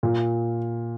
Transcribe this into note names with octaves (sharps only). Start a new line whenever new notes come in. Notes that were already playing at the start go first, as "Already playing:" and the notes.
A#2